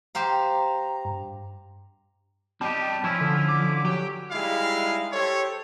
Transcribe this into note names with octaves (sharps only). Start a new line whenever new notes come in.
G4 C5 F5 A#5
G2
G3 C4 G4 D#5 A5
F3 C#4 E4 F4
D3
D6
F#3 G4
G3 G#3 D#4 E4 F5
G4 A4 C5 C#5